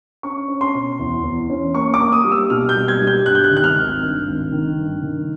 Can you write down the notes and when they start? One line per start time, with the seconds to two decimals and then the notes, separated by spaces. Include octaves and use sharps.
0.23 C#4 C#6
0.48 C#4
0.61 C6
0.74 B2
0.99 E2
1.24 E2
1.50 C#4
1.74 A#3 C#6
1.94 D6
2.00 A#3
2.12 D#6
2.25 G3
2.32 E6
2.50 B2 F6
2.69 G6
2.75 G3
2.88 G#6
3.01 G3
3.07 G6
3.26 G2 F#6
3.35 G6
3.44 F#6
3.51 D#3
3.57 F#6
3.64 F6
3.77 G#1
4.02 G2
4.27 G#1
4.52 D#3
4.78 G2
5.03 D#3